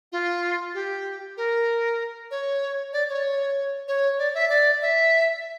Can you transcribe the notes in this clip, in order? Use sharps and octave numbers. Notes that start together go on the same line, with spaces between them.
F4
G4
A#4
C#5
D5
C#5
C#5
D5
E5
D5
E5